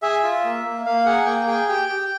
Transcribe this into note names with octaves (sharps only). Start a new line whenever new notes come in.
G#4 E5
F4
A#3
A#3
A#3 F5
G#4 F#5
A#3 G5
G#4 G5
G4 G5
G4